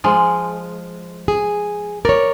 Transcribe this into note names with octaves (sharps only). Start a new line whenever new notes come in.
F3 G#3
G#4
A#4 C#5 D5